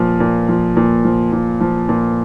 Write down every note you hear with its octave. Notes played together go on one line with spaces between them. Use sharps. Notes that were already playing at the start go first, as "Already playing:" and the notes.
Already playing: A#2 F3
A#2
F3
A#2
F3
A#2
F3
A#2